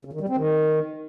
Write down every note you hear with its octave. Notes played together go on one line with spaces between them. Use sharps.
C#3
D#3
G3
C4
D#3